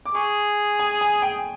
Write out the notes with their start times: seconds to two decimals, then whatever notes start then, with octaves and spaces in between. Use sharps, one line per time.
0.06 D6
0.15 G#4 C#6
0.79 G#5
1.01 G#5
1.22 G5